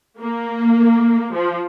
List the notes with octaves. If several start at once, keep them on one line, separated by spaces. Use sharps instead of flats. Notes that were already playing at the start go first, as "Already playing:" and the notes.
A#3
F3